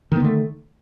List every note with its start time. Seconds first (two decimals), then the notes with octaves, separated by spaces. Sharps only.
0.12 D#3
0.16 B3
0.20 D3
0.24 A3